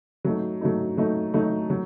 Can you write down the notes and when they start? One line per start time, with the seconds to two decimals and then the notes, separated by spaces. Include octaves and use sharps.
0.25 F#3 A3 D#4
0.61 F#3 A3 D#4
0.97 F#3 A3 D#4
1.34 F#3 A3 D#4
1.70 F#3